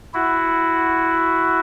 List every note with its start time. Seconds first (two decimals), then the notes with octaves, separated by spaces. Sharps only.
0.14 E4 F#4